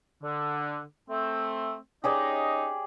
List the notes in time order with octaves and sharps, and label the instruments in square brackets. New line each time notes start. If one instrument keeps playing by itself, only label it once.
[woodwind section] D3
A3 C4
[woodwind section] C#4 D#4 D#5 [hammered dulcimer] G4 G#4 D5